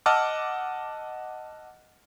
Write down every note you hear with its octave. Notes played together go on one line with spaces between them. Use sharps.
D#5 F#5 A5 D6 E6 F6